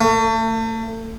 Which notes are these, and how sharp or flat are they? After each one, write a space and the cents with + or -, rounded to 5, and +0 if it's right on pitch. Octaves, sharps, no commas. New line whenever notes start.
A3 +35